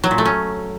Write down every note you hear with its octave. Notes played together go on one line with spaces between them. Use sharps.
F#3
A#2
A3
C#4